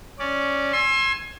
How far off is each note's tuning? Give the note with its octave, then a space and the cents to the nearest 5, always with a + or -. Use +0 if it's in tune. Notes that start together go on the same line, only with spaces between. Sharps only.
C#4 +0 D5 +0
G#5 +0 C6 +35 E6 +15